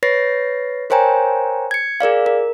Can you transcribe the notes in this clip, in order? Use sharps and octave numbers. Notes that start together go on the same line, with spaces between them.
B4 C#5 A6 A#6 C7
A#4 C5 C#5 G5 G#5 A#5
G#6 C#7
G#4 A#4 D5 F5
A#4